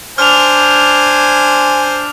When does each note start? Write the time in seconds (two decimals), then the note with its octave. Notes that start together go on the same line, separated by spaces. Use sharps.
0.18 D4 C5 G#5 F6 F7